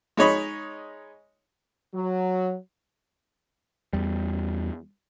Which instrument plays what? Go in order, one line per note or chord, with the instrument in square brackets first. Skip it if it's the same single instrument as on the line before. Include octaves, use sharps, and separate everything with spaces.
[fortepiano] G#3 D#4 C#5 B5
[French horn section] F#3
[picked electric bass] E2 G3